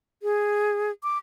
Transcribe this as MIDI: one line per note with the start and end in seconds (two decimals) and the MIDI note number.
0.23 0.91 68
1.03 1.18 86